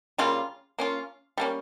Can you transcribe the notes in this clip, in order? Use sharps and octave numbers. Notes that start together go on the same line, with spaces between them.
C#3 G3 A#3 F4
A#3 C#4 F4
G3 A#3 C#4